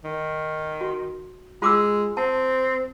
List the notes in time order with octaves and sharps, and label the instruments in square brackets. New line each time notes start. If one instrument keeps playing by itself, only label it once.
[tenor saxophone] D#3
[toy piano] F#4
[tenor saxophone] G#3 [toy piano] F4 D6 E6
[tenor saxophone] C4 [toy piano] A5